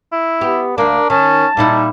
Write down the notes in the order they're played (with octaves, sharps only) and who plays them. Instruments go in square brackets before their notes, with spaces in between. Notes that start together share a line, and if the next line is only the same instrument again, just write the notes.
[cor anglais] E4
[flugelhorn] B3 [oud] G4
[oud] D2 A#3 [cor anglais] D4 [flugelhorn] A#4
[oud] D#3 [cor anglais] C#4 [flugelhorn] A5
[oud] A#2 D#4 E4 [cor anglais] G3